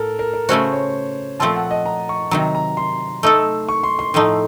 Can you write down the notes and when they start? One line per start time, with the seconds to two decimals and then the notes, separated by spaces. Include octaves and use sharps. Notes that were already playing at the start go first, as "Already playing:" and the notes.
Already playing: A2 A4 A#4
0.19 A#4
0.33 A#4
0.49 C#3 A3 C#4 F#4 C5
0.72 C#5
1.40 A#2 F3 A3 C4 F4 A5
1.56 F#5
1.71 D#5
1.86 A#5
2.09 C#6
2.31 C3 D#3 F#3 A#5
2.55 A#5
2.77 C6
3.23 A3 D#4 A4
3.69 C#6
3.83 C6
3.99 C6
4.14 A2 F3 A3 D#4